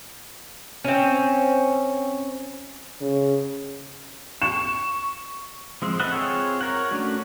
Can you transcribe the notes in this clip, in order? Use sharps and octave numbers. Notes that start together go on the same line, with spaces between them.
C4 C#4
C#3
C#6 E7
F3 G#3 C4
A4 B4 D#5 E5 F#5
C4 F4 G#4 C#5
A#4 C#5 F#5
A3 C#4 D4 F#4